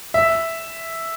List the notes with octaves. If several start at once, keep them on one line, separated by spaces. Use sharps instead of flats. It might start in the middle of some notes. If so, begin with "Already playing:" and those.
E5